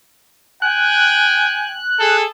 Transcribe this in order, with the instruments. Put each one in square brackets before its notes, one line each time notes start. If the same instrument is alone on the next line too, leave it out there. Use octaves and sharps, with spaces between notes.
[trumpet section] G5 G#5 [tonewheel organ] F#6
[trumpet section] G#4 A4